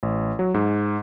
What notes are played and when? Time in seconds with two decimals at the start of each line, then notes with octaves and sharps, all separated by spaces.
0.03 A1
0.39 F#3
0.54 G#2